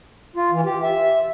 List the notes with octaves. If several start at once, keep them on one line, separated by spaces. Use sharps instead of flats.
F4
E3
G4
E5